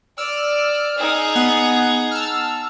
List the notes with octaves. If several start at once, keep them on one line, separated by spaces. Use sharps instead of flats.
D5 E6 F6
D#4 G#4
B3 F#5
A5 E6 F6